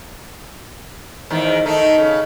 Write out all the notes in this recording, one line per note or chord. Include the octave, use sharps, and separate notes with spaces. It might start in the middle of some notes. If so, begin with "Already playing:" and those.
E2 G#2 D#3
D#3 A3 D#4
C#3